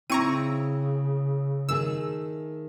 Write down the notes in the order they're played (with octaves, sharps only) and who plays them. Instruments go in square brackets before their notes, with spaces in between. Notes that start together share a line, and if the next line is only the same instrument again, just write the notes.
[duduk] C#3 [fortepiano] C4 E4 [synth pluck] A#5 C#6 D#7
[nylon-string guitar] D#3 A3 G#4 [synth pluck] E6